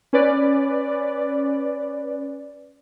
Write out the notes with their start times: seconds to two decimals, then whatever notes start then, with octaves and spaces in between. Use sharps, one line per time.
0.13 C#4 B4 D5